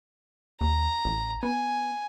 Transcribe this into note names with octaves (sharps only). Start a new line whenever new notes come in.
D#2 A#5
A1
B3 G#5